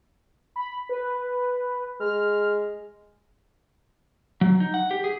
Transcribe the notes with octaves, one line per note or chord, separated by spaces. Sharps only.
B5
B4
G#3 F6
F#3
D#4
F#5
G4
G#4